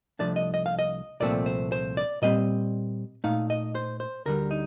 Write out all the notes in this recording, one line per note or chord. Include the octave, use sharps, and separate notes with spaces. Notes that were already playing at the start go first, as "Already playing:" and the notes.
C2 C3 F3 A3 D4 D5
D#5
D#5
F5
D#5
C2 A#2 F3 A3 C4 D5
C5
C5
D5
A#2 G3 C4 D#5
A#2 A3 D#4 F5
D#5
C5
C5
D2 D3 G3 A#4
D#4